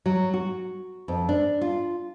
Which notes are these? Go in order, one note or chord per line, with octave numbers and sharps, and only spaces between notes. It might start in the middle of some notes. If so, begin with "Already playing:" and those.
F#3
F#4
F2
D4
F4